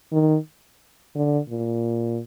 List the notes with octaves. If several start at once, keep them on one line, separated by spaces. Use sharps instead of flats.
D#3
D3
A#2